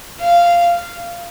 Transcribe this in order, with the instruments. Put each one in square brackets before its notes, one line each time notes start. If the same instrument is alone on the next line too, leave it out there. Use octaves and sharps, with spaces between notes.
[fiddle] F5